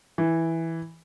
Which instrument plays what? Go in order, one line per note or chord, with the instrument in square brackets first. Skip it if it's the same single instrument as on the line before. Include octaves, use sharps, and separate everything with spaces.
[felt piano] E3